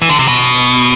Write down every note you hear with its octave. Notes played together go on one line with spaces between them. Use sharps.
E3
D3
C3
B2